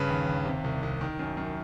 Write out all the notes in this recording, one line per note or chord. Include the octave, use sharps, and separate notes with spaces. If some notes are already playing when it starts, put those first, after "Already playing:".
Already playing: G2 C#3 B4
D#2
D#2
C3
C2
C2
D#3
F#2
F#2